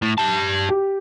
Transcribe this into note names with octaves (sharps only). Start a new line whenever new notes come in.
A2
G4 A5
G4